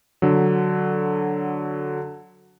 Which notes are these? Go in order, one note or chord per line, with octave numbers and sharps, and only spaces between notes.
D3 F#3